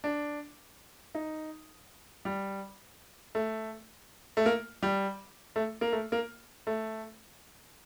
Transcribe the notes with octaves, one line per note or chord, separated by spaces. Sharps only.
D4
D#4
G3
A3
A3
A#3
G3
A3
A#3
A3
A#3
A3